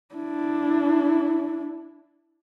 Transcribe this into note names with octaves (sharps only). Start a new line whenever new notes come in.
D4 E4